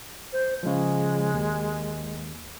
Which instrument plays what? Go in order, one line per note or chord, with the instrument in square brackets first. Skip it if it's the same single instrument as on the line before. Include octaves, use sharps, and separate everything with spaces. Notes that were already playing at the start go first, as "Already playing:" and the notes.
[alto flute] C5
[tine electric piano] C#3 F3 [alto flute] G#3
[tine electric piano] D#2